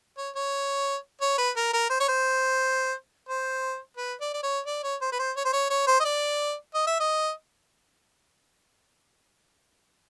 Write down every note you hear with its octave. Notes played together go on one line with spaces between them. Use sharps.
C#5
C#5
C#5
B4
A#4
A#4
C5
C#5
C5
C5
B4
D5
D5
C#5
D5
C#5
C5
B4
C5
C#5
C5
C#5
C#5
C5
D#5
D5
D#5
E5
D#5